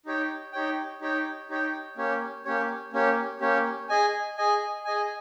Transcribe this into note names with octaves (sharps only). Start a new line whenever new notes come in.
D#4 G4 C#5 G5
D#4 G4 C#5 G5
D#4 G4 C#5 G5
D#4 G4 C#5 G5
A#3 C#4 G4 C#5
A#3 C#4 G4 C#5
A#3 C#4 G4 C#5
A#3 C#4 G4 C#5
G#4 D#5 G#5
G#4 D#5 G#5
G#4 D#5 G#5